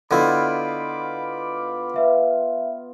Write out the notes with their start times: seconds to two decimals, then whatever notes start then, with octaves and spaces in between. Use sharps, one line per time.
0.11 D3 B3 E4 F4 D#5 B5 D6 G6
1.94 B4 E5 F5